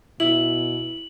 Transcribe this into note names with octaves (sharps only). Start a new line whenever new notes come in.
B2 E4 F#7